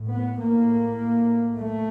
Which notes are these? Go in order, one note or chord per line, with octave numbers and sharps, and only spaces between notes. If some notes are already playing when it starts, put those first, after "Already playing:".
Already playing: A2
B3
A#3
A3